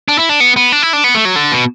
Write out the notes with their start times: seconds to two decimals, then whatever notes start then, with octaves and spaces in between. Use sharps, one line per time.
0.08 D4
0.19 E4
0.29 D4
0.40 B3
0.56 B3
0.72 D4
0.82 E4
0.93 D4
1.04 B3
1.15 A3
1.25 F#3
1.36 D3
1.52 B2